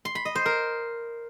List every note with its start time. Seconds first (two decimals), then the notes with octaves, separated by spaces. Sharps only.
0.05 C6
0.15 B5
0.25 D#5
0.35 C5
0.46 A#4